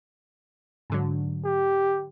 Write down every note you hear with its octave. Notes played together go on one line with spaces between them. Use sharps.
G#2 D3 F#3
G4